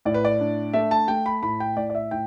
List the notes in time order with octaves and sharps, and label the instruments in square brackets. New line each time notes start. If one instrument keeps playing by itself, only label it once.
[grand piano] A2 D5
B4
D5
D4
A3 E5
A5
A3 G5
B5
A2 B5
G5
A2 D5
D5
E5
A2 G5